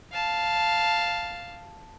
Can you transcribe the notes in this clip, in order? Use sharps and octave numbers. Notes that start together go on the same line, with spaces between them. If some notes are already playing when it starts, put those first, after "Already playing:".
F5 A5